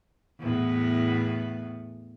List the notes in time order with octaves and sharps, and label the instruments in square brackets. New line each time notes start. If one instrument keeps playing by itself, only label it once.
[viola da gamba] E2 A2 B3